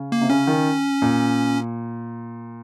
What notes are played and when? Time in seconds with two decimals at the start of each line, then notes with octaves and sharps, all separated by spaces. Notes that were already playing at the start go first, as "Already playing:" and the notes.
Already playing: C#3
0.12 A#3
0.22 C3
0.30 C#3 C#4
0.47 D#3
1.02 A#2